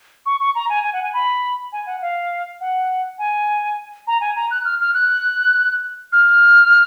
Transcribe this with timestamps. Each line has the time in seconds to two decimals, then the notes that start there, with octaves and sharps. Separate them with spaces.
0.26 C#6
0.40 C#6
0.55 A#5
0.70 G#5
0.83 G#5
0.93 F#5
1.03 G#5
1.14 B5
1.73 G#5
1.86 F#5
2.02 F5
2.61 F#5
3.19 G#5
4.07 A#5
4.21 G#5
4.36 A#5
4.51 F#6
4.65 F6
4.81 F6
4.94 F#6
6.12 F6